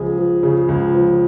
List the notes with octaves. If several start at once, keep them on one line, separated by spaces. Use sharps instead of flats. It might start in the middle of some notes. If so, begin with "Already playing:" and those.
Already playing: C#2 F3 G#4
F3
C#3
C#2
F3